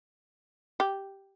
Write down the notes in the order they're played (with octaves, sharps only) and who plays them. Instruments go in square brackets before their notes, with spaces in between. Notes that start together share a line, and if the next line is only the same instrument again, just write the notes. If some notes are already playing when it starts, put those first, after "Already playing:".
[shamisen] G4